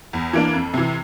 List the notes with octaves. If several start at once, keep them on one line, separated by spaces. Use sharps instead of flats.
E2
E3 A#3 D4
F2
C3 E3